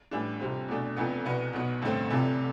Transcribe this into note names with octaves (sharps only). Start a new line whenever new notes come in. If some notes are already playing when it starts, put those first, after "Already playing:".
A1 A2 E3 G3 D4
F2 C3 G3 C4
E2 B2 A3 D4
F1 F2 E3 B3
C2 B2 B3 E4 B4
B1 B2 B3
A1 G2 D3 A3 C4
F1 F2 C3 E3